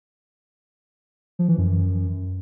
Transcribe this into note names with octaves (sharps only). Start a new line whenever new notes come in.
F3
E3
F#2